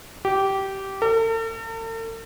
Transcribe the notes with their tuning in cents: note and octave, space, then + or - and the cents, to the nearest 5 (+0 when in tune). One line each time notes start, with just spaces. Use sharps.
G4 -15
A4 +45